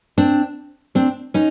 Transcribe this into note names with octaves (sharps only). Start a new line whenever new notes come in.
C4 D4
C4 D4
C#4 D#4